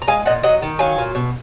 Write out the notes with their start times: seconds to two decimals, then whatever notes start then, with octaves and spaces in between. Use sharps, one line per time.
0.02 A#5
0.07 G#3 F5 G#5
0.26 A#2 D#5 F#5
0.43 F#3 D#5 F#5
0.62 D#3
0.79 F#3 F5 G#5
0.98 A#2
1.15 B2